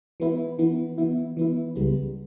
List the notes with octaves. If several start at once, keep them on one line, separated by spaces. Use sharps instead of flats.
E3 B3 E4
E3 B3 E4
E3 B3 E4
E3 B3 E4
C#2 C#3 G3 B3